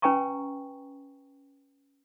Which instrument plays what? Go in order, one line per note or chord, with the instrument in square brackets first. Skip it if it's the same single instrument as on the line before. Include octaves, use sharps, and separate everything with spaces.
[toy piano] C#4 B4 G5 G#5 A#5 C#6